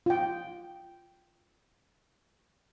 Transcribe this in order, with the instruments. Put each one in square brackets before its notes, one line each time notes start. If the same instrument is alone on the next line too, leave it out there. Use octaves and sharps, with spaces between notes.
[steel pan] F4 G5